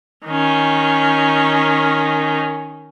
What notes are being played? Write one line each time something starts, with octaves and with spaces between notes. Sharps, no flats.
D#3 C#4